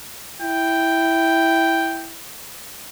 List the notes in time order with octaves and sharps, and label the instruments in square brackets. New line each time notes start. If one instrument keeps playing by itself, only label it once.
[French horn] E4 [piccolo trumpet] G5